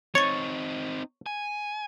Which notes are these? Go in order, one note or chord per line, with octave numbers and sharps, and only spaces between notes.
C4 D#4 C#5 C#6 A6 C#7
G#5